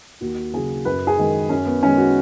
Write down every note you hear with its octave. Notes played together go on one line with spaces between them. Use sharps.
D#2 F#4
C#3 F#3 G#4
F#2 B4
G#4
D#3 G#3
F#2 C#4
B3
D#3 G#3 C#4
F#4